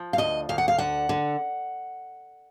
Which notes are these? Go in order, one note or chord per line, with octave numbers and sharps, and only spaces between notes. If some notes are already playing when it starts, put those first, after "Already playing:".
Already playing: F3
F5
D2 D#5
D2 F5
F#5
F5
D3 F#5
D3